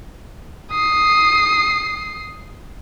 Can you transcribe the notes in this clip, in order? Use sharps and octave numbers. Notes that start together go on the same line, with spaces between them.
D#6 C7